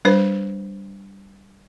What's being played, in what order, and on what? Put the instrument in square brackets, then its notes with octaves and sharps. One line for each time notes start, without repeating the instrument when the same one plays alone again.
[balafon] G3 D4 B4 C5